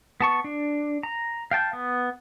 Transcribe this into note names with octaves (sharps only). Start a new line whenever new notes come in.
B3 A5 C#6
D4
A#5
F5 G5 A5 G6
B3